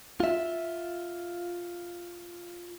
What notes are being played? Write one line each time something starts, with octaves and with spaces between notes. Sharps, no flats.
F4 E5